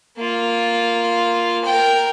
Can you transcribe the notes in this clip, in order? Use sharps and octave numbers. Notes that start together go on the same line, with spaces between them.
A#3 F4
A#4 G5